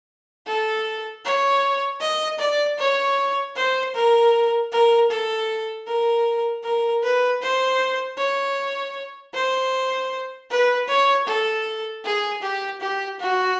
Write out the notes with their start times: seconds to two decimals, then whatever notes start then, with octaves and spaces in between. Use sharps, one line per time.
0.47 A4
1.25 C#5
2.01 D#5
2.39 D5
2.79 C#5
3.56 C5
3.95 A#4
4.72 A#4
5.10 A4
5.86 A#4
6.64 A#4
7.03 B4
7.42 C5
8.18 C#5
9.34 C5
10.50 B4
10.88 C#5
11.27 A4
12.05 G#4
12.42 G4
12.81 G4
13.20 F#4